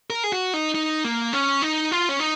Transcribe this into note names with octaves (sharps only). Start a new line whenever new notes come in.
A#4
G#4
F#4
D#4
D#4
A#3
C#4
D#4
F4
C#4
D#4